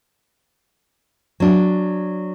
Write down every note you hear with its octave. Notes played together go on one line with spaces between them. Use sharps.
F#3 D4